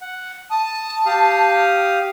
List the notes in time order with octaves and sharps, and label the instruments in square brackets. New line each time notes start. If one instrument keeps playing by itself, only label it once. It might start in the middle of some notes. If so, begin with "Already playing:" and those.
[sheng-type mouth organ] F#5
[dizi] A5 [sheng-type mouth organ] D#6
[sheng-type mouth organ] G4 F5 D#6